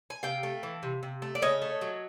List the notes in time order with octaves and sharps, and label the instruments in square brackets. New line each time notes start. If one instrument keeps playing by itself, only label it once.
[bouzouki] G#5
C3 F5 G5
A3
E3
C3
C3
A3
D5
C#3 C#5 D#5
A3
F#3